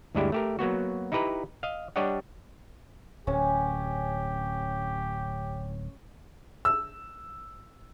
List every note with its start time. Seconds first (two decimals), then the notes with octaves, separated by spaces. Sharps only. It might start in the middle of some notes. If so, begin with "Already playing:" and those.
0.15 D2 G2 G#3 D4 E4 G4
0.32 A3 G4 A#4
0.59 F#3 A#3 B3 F#4
1.12 D#4 E4 G4 B4 A#5
1.63 D#5 F5
1.96 G3 D4 G4 C#5 D#5 F#5
3.27 D1 C#4 G4
6.65 E6